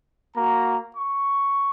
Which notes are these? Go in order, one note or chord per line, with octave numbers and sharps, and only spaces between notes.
A#3 F#4 A#5
C#6